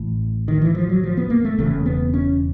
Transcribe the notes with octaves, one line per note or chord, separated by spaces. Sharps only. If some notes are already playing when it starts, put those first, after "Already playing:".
Already playing: A1 A2
D#3
E3
F3
F#3
F3
B3
A#3
A3
E1 E2 C#3 A3
B3
C#4